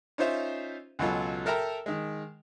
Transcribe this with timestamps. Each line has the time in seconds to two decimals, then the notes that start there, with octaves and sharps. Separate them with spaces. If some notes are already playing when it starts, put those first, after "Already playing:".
0.18 C#4 D#4 F4 C5 E5
0.99 C#2 B2 F#3 F4 A4
1.46 A4 A#4 E5 G5 A#5
1.86 D#3 G#3